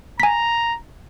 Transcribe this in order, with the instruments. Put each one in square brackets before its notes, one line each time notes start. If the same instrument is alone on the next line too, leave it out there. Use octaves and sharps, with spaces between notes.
[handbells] G#5 B6 [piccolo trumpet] A#5